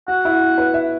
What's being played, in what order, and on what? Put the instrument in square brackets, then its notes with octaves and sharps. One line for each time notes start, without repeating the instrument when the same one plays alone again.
[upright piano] F#4 [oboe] F#5
[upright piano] E4
B4
E5